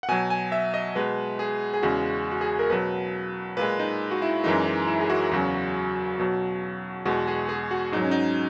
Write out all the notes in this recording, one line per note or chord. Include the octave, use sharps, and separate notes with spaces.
F#5
B2 F#3 G#5
G#5
E5
D#5
B2 G#3 B4
G#4
G#4
E2 C#3 G#3 F#4
F#4
G#4
A#4
B2 F#3 B4
A#2 G#3 B4
D#4
F#4
E4
F#2 E3 G#3 D#4
D#4
E4
G#4
F#4
E2 C#3 F#3
B2 F#3
E2 B2 G#3 F#4
G#4
G#4
F#4
G#2 F#3 D#4
C#4
D#4